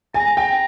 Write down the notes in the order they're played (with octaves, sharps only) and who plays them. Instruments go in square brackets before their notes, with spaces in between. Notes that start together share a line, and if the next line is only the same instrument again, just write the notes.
[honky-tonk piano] G#5 [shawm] A#5
[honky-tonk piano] G5